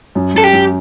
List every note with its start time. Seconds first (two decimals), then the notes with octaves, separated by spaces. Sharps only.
0.15 F#2
0.34 F#2 A4
0.44 G4
0.53 F#2